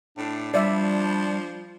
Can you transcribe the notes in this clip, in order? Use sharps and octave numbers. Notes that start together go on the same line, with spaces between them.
A2 D4
F3 G3 D5 E5